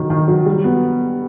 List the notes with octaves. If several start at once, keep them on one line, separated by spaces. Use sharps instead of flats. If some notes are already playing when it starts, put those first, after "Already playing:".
Already playing: D#3 F#3
D#3
F#3
G3
B3